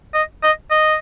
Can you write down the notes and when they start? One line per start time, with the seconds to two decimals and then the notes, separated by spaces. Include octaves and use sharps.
0.14 D#5
0.43 D#5
0.71 D#5